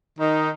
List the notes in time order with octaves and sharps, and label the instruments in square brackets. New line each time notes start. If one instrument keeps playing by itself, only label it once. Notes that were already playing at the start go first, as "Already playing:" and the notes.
[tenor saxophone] D#3 [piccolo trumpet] D#4